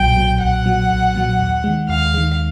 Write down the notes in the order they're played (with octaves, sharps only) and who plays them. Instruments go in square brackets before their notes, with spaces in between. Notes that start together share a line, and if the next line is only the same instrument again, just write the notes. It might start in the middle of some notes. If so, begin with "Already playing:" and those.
Already playing: [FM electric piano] B1 A#2 F#3 [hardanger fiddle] G5
[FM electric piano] A#2 F#3
[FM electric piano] B1 [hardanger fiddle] F#5
[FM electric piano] A#2 F#3
B1
A#2 F#3
D#2
D#3 G#3
[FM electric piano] D#2 [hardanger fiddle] F5
[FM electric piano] D#3 G#3